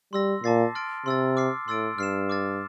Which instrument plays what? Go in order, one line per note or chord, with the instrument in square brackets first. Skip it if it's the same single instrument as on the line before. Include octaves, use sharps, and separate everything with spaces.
[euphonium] G3 [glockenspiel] C6 E6 A#6
[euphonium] A#2 [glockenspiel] A5 D6 A6 C7
[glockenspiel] C6 F6 A6 D7
[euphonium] C3 [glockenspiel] C6 E6 A6
[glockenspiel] D6 F6 C7
[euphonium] A2 [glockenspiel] C6 E6 A6 D7
[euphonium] G2 [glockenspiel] F6 C7 E7
[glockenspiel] D6 F6 A6